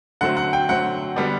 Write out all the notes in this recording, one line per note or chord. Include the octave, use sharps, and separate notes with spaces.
D3 F#3 A3 C4 F#5
F#5
G5
D3 F#3 A3 C4 F#5
D3 G3 B3 D4